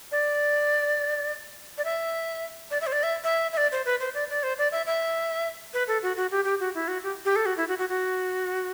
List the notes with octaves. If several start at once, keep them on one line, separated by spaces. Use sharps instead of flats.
D5
D5
E5
D5
E5
C5
D5
E5
E5
E5
D5
C5
B4
C5
D5
D5
C5
D5
E5
E5
B4
A4
F#4
F#4
G4
G4
F#4
E4
F#4
G4
G4
A4
F#4
E4
F#4
F#4
F#4